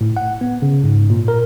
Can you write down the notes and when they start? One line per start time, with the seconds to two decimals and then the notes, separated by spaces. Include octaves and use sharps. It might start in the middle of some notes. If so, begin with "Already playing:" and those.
0.01 A2
0.17 F#5
0.41 B3
0.62 C#3
0.84 G#2
1.10 A#2
1.28 A#4